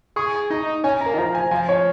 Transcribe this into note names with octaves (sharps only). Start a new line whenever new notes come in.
G#4 C#6
D#4 A#5
C#4 G#5
A#5
A#3
D#3
F3 A#5
G#5
F3 G#5
C#5